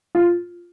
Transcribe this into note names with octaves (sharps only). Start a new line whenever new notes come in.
F4